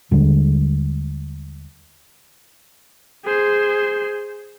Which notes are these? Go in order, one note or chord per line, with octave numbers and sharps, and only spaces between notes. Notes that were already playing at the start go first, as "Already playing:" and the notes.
D#2 D3 G3 G#3
G#4 C5